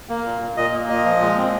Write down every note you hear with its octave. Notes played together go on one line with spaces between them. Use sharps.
A#3
A#2
A#2
A#2 D#5
A#3
A#2 D#5
F3
G#3
C4